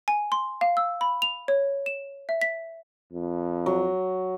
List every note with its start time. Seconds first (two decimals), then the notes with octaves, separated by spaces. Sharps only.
0.08 G#5
0.32 C6
0.61 F5
0.77 E6
1.01 B5
1.22 F7
1.48 C#5
1.86 E7
2.29 E5
2.42 B6
3.13 F2
3.66 F#3